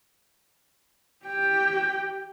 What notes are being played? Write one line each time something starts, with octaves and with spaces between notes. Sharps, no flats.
G4 G5